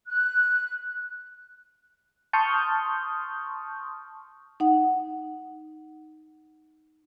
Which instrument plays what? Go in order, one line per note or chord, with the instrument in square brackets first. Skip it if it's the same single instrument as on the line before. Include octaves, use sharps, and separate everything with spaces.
[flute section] F#6
[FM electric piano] A5 C6 C#6 D#6 F6 G6
[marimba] D#4 F#5